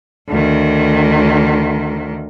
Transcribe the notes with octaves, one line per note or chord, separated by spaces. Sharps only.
D2 D#3